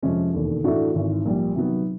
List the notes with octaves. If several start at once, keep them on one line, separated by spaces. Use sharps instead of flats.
F2 C3 F3 G#3 C#4
E1 D#2 D3
A2 E3 A3 D4 F#4
G#1 G#2 E3
A#1 A#2 G3
C3 D#3 F#3 B3